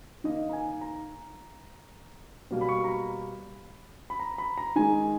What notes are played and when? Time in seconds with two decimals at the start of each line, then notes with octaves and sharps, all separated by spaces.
0.24 D#3 A#3 D#5
0.49 A#5
0.53 G#5
0.81 A#5
2.51 B2 G3 A#3
2.61 B5
2.69 C#6
2.84 A#5
2.88 B5
4.10 B5
4.20 A#5
4.38 B5
4.58 A#5
4.76 D#3 G#3 G#5